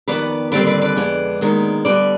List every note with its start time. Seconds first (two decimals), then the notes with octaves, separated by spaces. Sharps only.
0.08 F2 D#3 B3 B4 D5
0.52 D#2 D3 G3 C4 B4 D5
0.67 B4 D5
0.82 B4 D5
0.96 F2 D3 G#3 B3
1.41 D#2 D#3 G#3 B3
1.85 D2 D3 G3 B3 B4 D5